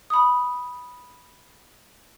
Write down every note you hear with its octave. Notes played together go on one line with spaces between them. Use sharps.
B5 D#6